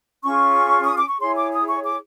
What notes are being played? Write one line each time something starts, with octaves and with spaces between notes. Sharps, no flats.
C#4 F4 G#4 C#6
D#6
D6
C#6
E4 G#4 C#5 C6
D6
D#6
C#6
D6